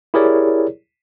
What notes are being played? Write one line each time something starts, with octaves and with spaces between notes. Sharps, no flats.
E4 G4 G#4 A#4 C#5 D5